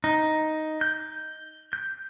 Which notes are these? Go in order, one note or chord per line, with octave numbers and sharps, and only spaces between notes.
D#4
G6
G6